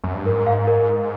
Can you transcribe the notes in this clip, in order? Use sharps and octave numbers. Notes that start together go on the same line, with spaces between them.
F#2
G2
G#2 A#4
F5
A#4